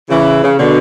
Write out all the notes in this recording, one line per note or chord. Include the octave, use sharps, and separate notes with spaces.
C#3 E3
C#3
B2 D3